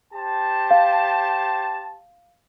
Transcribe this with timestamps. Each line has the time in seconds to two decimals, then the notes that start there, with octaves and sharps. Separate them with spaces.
0.13 G4 C5 A5
0.71 F5